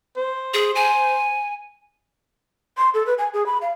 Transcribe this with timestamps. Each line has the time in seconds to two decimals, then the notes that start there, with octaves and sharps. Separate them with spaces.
0.17 C5
0.54 G#4
0.75 G#5
2.77 C6
2.94 A4
3.06 B4
3.18 G#5
3.34 G#4
3.46 B5
3.62 F5